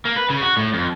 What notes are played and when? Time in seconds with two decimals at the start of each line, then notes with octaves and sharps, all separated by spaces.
0.05 A#3
0.17 B4
0.30 C#3
0.42 F#4
0.57 A2
0.74 F2